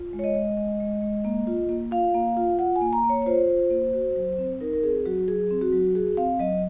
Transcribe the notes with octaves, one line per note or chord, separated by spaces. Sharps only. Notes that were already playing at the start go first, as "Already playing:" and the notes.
Already playing: F4
G#3
C#5
D#5
G#3
G#3
G#3
G#3
A#3
F4
A#3
F4 F5
A#3
F4
F4 F#5
G#5
A#3
A#5
A#3
C#5
C#5
F4 C5
F4
A#3
F#4
F#3
C4
D#4 A#4
A#4
C4 G#4
F#3 F#4
F#3 G#4
C4
F#4
F#3
F#4 G#4
C4 F5
F#3 D#5